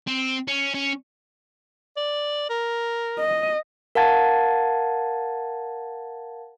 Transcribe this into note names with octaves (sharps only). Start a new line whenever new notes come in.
C4
C#4
C#4
D5
A#4
D#5
A#4 F5 F#5 A5 G#6 A6